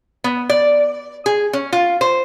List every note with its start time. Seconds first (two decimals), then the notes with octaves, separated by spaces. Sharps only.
0.24 B3
0.50 D5
1.26 G#4
1.53 C#4
1.73 F4
2.01 C5